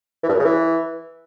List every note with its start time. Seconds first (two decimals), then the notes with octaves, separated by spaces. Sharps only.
0.23 E3
0.29 G2
0.34 F#2
0.39 C#3
0.45 E3